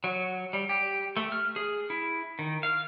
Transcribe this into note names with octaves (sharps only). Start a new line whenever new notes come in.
F#3
G3
G4
A3
F6
G#4
E4
D#3
F5